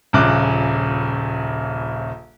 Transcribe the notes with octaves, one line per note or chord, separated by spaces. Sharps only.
D#1 A#1 C#3 D6 F#6